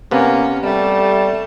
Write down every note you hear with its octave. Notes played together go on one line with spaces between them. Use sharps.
C3 A#3 B3 C#4
G3 A3